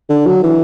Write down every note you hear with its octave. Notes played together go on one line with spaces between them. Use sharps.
D3
F#3
E3